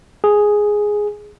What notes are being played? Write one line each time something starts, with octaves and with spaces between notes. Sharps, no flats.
G#4